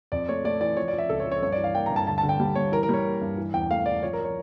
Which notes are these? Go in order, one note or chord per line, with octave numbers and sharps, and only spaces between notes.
F2 D5
A3 C#5
A3 D5
E3 D5
F3 C#5
D5
F3
E5
C#2 A4
C#5
F3
C#5
G2 C#5
D5
E3
F5
A#3 G5
G2 A#5
A5
D2 A5
A5
D3
G5
G3
G3 C#5
E3 A#4
A#4
G3 C#5
A#3
G2
E3
E2 G5
A3 F5
E2 D5
F3 C#5
A#4
F3
C#5